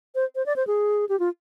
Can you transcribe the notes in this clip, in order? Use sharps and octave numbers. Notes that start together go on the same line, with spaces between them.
C5
C5
D5
C5
G#4
G4
F4